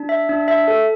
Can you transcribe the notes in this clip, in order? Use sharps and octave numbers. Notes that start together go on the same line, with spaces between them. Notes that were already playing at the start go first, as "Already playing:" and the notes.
Already playing: D4
E5
D4
E5
A4